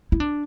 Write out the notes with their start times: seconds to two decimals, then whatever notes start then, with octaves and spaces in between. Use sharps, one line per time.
0.12 E4
0.20 D4